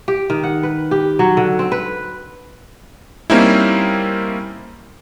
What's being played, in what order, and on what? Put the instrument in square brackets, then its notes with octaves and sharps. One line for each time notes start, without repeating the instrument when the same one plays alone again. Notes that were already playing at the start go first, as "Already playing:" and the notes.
[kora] G4
D#3
F#5
B4
G4
F#3
D3
C4
B4
[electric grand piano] G3 A#3 C4 C#4 D#4 E4